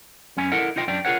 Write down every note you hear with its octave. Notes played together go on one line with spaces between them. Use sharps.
F#2 C#4 G#5
E4 A4 A#4 D#5 F#5
D#4 F4 D#5 G5
F#2 D4 D5 G5
F4 G#4 A#4 C#5 F#5